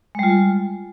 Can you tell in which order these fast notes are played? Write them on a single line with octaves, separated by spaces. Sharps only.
G#3 G3 F4